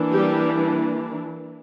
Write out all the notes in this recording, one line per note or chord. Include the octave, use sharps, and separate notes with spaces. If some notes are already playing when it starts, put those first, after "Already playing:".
Already playing: E3 A#3 D4
G3 G4